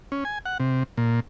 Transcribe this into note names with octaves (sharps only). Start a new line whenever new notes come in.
C#4
G#5
F#5
C3
A#2